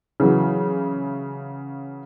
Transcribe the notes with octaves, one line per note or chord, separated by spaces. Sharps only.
C#3 E3 F#3